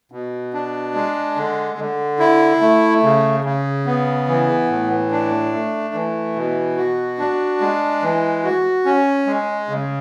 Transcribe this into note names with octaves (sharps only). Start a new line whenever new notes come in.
B2
D4
G#3
D3
D3
E4
A3
C#3
C#3
B3
E3
A2
D4
A3
E3
B2
F#4
D4
G#3
E3
F#4
C#4
G#3
C#3